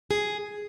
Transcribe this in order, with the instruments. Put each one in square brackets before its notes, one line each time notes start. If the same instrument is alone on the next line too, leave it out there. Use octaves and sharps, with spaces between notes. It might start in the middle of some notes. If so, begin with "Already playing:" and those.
[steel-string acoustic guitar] G#4